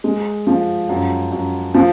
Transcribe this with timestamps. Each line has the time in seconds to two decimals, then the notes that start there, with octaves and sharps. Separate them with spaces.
0.04 G#3
0.47 F3
0.89 F#2
1.32 F#2
1.74 F3